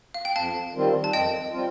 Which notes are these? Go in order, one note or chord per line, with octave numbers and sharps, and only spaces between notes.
F5
G5
F2 F5 A5
D#3 G3 C4 F4
A5
F2 D#5 G5
G3 C4 F4